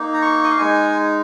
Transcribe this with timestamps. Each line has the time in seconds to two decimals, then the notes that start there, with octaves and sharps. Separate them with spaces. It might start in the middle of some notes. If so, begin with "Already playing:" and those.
Already playing: A#3 D#4
0.14 A#5
0.22 C#6
0.44 D#5
0.51 F5
0.59 G#3 D#4 G#5